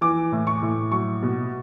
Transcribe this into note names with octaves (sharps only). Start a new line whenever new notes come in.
E3 D6
A2
C#6
A2
F#3 C#6
B2